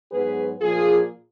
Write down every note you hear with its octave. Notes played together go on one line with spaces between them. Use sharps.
G#2 F#3 B3 G#4 B4
A#2 F3 A#3 F4 G#4